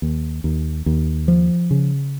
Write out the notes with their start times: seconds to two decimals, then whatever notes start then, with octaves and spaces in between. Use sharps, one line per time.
0.02 D#2
0.44 D#2
0.86 D#2
1.28 F3
1.71 C#3